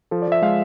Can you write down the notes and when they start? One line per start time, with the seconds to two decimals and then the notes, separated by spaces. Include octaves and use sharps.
0.11 F3 A4
0.22 D5
0.28 F3 E5
0.42 G#3 F5